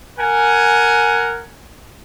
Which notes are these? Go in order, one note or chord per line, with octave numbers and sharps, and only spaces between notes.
A#4 F#5 G#5